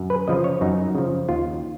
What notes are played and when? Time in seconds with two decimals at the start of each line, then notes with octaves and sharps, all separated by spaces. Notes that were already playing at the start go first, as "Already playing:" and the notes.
Already playing: F#2
0.10 B4
0.28 C#3 F3 D#5
0.44 C#5
0.61 F#2 D#4
0.95 C#3 F3
1.29 D#2 F4